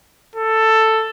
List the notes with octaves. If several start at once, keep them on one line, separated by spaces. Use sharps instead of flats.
A4